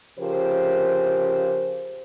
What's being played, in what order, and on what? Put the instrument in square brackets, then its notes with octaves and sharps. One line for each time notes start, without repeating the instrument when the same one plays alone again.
[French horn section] C#3 F3 G4 A#4 C5